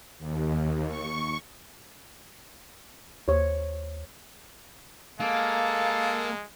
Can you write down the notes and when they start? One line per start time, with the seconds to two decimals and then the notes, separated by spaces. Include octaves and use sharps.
0.19 D#2
0.87 C#6
3.28 D#2 C5 C#5
5.20 G#3 A#3 A4 F5